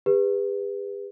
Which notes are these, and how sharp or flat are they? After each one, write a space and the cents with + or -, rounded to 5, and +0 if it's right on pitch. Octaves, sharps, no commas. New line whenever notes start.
G4 +45 B4 +0